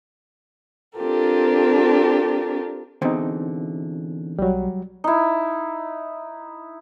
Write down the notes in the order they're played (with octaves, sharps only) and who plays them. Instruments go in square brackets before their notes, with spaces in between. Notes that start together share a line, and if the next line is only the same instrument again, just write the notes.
[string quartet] C4 D4 F4 G4 A4 A#4
[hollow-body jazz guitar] E2 B2 D3 [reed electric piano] C4 D#4
[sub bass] B1 [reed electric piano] F#3 G3
[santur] D#4 E4